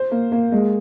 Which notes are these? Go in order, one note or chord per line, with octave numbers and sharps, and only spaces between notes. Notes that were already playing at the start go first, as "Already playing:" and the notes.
Already playing: C5
A#3
A#3
G#3